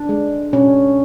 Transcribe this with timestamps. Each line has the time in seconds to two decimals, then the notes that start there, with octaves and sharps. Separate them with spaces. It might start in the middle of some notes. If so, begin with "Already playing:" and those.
Already playing: D4
0.09 G#3
0.53 B2 C#4